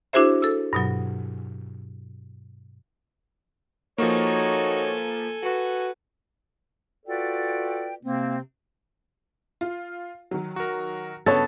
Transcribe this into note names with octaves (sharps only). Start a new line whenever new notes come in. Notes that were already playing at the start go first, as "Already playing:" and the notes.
D4 E4 F#4 G#4 C5 E5
A4 E6
G2 B2 F#3
F3 A#3 D#4 F#4 A4 C#5 G#5
F#4 B4
F4 F#4 A4 B4 D5 G5
C3 A#3 C4
F4
D#3 F#3
F#4 A#4
G2 C#3 B3 A4 C#5 A5 A6